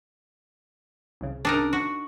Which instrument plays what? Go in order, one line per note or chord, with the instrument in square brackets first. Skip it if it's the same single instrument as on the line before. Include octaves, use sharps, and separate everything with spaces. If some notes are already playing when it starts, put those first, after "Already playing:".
[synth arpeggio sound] C2 C#3
[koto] D4 D#4 A#4
F#4